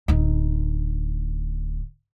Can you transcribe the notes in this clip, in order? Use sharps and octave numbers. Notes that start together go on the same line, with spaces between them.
D1 D#4